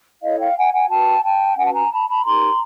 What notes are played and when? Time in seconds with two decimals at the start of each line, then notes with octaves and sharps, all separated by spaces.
0.22 E4 A4 C#5 D#5 F5
0.39 F5 G5
0.56 F#5 G#5
0.73 F#5 G#5
0.89 F#4 B4 G5 A5
1.23 G5 A5
1.56 C#4 F#4 B4 F#5 G#5
1.66 A5
1.74 G#5 A#5
1.90 A5 B5
2.07 A5 B5
2.24 D#4 G4 A#4 A#5 C6